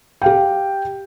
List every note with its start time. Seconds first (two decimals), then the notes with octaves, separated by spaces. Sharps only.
0.22 G4 F5 G5